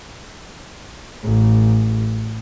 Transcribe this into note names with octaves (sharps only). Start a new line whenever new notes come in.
A1